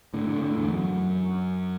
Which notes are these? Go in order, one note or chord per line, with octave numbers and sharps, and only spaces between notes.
A2 D3
A2 D3
A2 D3
E2 A2
F#2